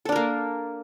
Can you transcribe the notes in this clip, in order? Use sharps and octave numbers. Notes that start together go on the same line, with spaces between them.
A#3 D4 A4 A#4